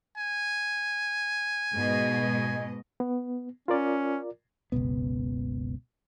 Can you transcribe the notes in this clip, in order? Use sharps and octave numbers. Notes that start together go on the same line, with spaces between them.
G#5
G#2 B2 D#5
B3
C#4 F4 A#4 D5
F#1 C#2 B2 B3